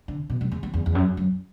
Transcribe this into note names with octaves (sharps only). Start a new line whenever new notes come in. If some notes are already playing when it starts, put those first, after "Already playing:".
D3
B2
F#2
E2
E2
E2
E2
F#2
F#2